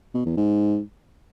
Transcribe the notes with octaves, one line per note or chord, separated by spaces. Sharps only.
B2
E2
G#2